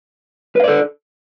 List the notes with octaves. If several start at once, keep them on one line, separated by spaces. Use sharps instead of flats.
A4 B4 D5 F5